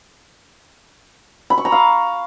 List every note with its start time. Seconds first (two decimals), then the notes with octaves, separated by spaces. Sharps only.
1.50 B5
1.58 C#6
1.65 A#5
1.72 F5